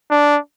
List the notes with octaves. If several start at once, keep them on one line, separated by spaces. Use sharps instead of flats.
D4